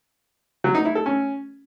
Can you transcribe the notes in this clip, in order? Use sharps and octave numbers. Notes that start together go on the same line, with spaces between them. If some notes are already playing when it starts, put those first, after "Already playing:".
F#3
D#4
E4
A4
C#4